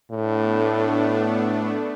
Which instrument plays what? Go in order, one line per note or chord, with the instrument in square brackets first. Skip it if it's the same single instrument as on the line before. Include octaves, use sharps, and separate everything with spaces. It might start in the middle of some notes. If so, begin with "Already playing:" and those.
[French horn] A2 [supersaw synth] A3 B3 D4